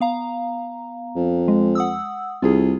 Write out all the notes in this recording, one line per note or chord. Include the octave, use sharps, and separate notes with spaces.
B3 F5 A#5
F2
G#3
F#5 D#6 E6
C2 F4 G#4